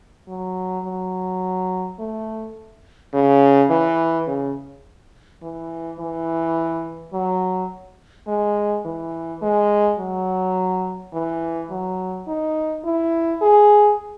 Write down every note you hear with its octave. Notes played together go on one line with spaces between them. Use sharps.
F#3
F#3
A3
C#3
E3
C#3
E3
E3
F#3
G#3
E3
G#3
F#3
E3
F#3
D#4
E4
G#4